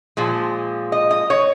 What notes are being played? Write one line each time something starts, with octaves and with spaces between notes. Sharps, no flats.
A#2 F3 G#3
D#5
D#5
C#5